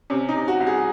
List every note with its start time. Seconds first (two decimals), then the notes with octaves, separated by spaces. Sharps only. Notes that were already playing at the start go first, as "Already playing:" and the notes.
0.10 C3 C#4
0.29 D#4
0.36 C3
0.48 F#4
0.60 C2
0.67 G#4